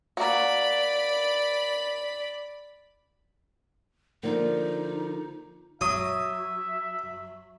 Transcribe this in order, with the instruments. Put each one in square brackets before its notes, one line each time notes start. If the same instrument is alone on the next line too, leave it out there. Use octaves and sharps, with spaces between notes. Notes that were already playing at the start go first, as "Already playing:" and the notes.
[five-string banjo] A#3 F#4 [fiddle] D5 B5
[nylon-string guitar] D3 F3 A#3 [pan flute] D#4
[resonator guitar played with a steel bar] F#3 [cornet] E5 [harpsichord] D#6